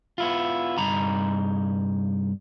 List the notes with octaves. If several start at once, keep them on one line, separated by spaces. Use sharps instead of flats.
B3 E4 F4
C2 G2 D#4 A#5 B5